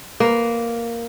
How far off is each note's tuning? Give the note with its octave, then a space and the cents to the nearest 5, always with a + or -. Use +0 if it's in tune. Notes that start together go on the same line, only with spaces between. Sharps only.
A#3 +0 B4 +15